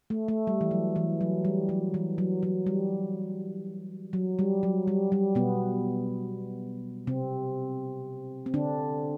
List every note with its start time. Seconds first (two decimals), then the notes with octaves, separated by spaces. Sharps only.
0.10 A3
0.28 A3
0.47 G3
0.61 E3
0.71 F#3
0.96 E3
1.21 F#3
1.45 G3
1.69 F#3
1.94 E3
2.18 F#3
2.43 F#3
2.67 G3
4.13 F#3
4.39 G3
4.63 F#3
4.88 G3
5.12 G3
5.35 B2 B3
7.07 C3 C4
8.46 C4
8.54 D3 D4